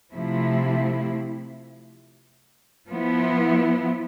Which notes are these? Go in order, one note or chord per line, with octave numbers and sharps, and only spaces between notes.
C3 F3 A3 E4
F3 B3 E4